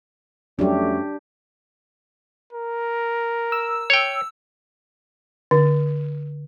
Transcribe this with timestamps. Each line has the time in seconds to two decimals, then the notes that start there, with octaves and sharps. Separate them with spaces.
0.59 F2 F#3 G3 A3 C#4 D4 G4
2.53 A#4
3.52 E6
3.90 C#5 G5
5.51 D3